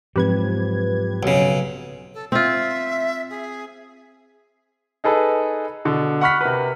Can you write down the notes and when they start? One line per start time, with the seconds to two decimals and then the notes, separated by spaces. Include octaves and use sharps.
0.16 G#2 F3 F#3 C4 G4 B4 G#6
1.23 B1 C#3
2.14 A4
2.32 C4 F4 E5
3.30 G#4
5.04 D#4 G#4 A4 B4
5.85 B2 D3
6.21 F#5 B5 C#6 F6 F#6 B6
6.41 C3 A#4 B4